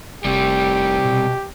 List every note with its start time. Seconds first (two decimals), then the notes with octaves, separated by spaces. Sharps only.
0.25 F1 C3 G3 G4
1.05 B2